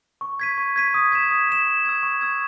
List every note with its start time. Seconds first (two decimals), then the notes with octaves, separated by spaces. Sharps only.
0.21 C#6
0.40 G#6 B6 D#7
0.58 C#6
0.76 G#6 B6 D#7
0.94 D#6
1.12 G#6 B6 E7
1.31 D#6
1.49 G#6 B6 E7
1.67 C#6
1.85 E6 G#6
2.03 C#6
2.21 E6 G#6